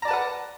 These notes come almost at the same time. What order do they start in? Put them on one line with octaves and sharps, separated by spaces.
A#5 D5 A5 B4 F#5